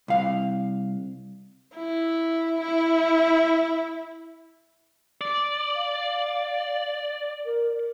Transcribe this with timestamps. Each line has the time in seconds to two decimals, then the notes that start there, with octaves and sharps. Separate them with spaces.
0.08 C2 F5
1.76 E4
2.61 E4
5.21 D5
5.76 F5
7.45 A#4